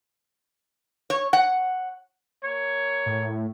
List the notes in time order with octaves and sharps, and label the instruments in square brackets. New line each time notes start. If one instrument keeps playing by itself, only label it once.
[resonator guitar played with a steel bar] C#5
F#5
[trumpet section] A#3 C#5
[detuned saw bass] A2